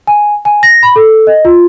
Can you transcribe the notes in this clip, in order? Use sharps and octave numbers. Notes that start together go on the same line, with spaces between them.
G#5
G#5
A#6
B5
A4
D#5
F4